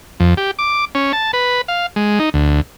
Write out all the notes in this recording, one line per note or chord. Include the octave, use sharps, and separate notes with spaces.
F2
G4
D6
C#4
A5
B4
F5
G#3
D#4
D2